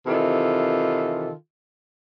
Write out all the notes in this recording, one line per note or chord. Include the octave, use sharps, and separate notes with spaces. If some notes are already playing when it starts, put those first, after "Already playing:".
C3 D#3 E3 F4 A4